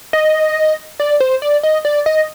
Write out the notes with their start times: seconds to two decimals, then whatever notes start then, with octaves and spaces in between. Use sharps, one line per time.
0.13 D#5
1.00 D5
1.20 C5
1.42 D5
1.63 D#5
1.85 D5
2.06 D#5